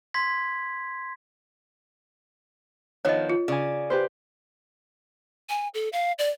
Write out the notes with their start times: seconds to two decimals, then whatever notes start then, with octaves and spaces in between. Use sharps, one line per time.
0.14 C6 G#6 B6
3.05 D#3 F3 B3 C#5 D#5
3.30 F4
3.48 C#3 D5 G#5
3.90 G4 B4 C5
5.49 G#5
5.74 A4
5.93 F5
6.19 D5